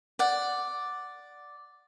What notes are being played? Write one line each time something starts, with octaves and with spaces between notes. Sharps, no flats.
D5 F#5